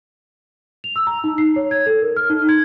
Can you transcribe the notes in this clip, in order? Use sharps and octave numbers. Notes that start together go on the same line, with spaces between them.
F7
E6
A#5
D#4
C7
C#5
G#6
A4
A#4
F6
D#4
G#6